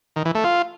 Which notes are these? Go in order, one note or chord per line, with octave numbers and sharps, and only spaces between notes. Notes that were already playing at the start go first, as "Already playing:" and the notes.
D#3
E3
A3
F4